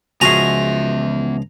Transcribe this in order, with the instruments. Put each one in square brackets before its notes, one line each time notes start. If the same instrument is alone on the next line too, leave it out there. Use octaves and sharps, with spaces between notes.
[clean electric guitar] C#2 F3 G#4 [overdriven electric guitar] B3 E5 [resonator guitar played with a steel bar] F#4 G#5 [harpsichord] A#5